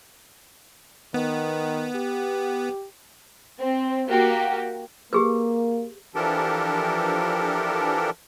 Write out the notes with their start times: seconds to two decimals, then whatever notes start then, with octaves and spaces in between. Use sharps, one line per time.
1.14 D#3 B3
1.95 G4
3.60 C4
4.09 A#3 F#4 G4
5.13 A#3 G4 G#4 B4
6.15 E3 F3 D4 G4 A4 A#4